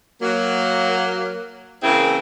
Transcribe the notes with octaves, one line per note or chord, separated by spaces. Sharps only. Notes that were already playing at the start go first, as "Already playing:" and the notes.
F#3 A#3
C#3 E3 A#3 C4 E4 G#4